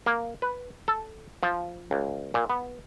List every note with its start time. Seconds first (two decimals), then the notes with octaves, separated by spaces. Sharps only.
0.06 A#3
0.42 B4
0.88 A4
1.43 F3
1.91 C#2
2.34 A#2
2.50 B3